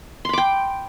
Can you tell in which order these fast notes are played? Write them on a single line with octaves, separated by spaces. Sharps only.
C6 B5 D6 G5